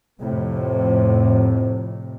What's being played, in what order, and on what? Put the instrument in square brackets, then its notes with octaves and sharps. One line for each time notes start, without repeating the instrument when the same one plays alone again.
[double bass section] F2 A2 C3